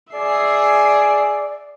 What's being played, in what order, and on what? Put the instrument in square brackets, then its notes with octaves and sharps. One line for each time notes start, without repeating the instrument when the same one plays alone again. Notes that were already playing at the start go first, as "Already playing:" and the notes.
[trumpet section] G#4 [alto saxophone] D5 [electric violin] E5 C7